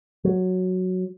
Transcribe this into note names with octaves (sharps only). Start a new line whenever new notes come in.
F#3